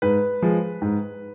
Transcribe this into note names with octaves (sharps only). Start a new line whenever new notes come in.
G#2 B4
F3 G#3
G#2